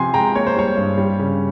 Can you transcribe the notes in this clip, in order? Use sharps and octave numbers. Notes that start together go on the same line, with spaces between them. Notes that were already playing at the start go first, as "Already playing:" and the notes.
Already playing: C3 F3 G#5 C6
G#3 G5 A#5
A#3 C#5
C5
G3 C#5
G2
G3
C#3